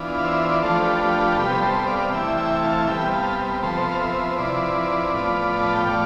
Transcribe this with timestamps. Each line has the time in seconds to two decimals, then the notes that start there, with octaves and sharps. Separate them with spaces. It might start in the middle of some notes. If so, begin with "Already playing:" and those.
Already playing: E3 B3 D4 F4
0.18 F5
0.24 C5 E5
0.52 D5
0.62 F3 A3 D4 F4 A4 C5
0.80 G4 B4
0.90 A4
1.00 G4 B4
1.18 G4 B4
1.32 A4
1.37 C3 G3 B3 G4 B4
1.62 A4 C5
1.87 D5 F5
2.12 C3 E3 A3 E4 E5 G5
2.37 E5 G5
2.63 F5 A5
2.87 C3 G3 B3 E5 G5
3.12 F5 A5
3.62 C3 F3 B3 A4 C5
3.92 F5
4.01 C5 E5
4.38 F3 C4 E4 B4 D5
5.14 A2 F3 B3 F4
5.63 A5
5.75 G5
5.88 A2 F3 A3 D5 F5